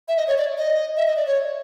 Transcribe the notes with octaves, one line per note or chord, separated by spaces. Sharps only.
E5
D#5
C#5
D5
D#5
E5
D#5
D5
C#5